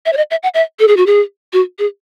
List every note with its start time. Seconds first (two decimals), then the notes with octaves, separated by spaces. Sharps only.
0.06 E5
0.13 C#5
0.17 D#5
0.31 E5
0.43 F#5
0.54 E5
0.79 A4
0.88 G#4
0.97 F#4
1.06 G#4
1.53 F#4
1.79 G#4